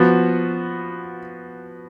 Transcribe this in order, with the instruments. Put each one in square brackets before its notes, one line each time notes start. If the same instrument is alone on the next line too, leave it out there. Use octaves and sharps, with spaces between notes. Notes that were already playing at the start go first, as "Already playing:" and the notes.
Already playing: [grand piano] F3 B3 F#4